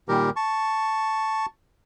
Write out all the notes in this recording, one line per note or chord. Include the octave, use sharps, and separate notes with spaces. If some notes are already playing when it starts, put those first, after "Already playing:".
A#2 D#3 G3 G4 A#4
A5 C#6